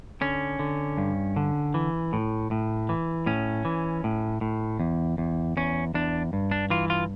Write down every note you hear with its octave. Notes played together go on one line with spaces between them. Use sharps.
D3 C#4
D3
G2
D3
E3
A2
A2
E3
A2 C#4
E3
A2
A2
E2
E2
E2 C#4
E2 D4
G2
D4
E3 F4
F4